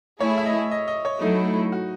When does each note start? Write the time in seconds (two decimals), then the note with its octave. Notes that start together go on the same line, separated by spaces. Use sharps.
0.20 A3 E4 G#4 C#5
0.38 E5
0.46 D#5
0.71 D#5
0.88 D#5
1.05 C#5
1.21 F#3 A3 D#4 E4
1.72 F#4